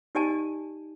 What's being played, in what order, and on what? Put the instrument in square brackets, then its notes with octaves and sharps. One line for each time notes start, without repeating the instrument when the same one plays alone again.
[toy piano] D#4 G4 D5 D#5 G#5 A5